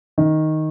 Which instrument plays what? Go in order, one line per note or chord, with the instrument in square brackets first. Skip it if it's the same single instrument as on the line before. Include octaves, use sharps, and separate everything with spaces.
[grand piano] D#3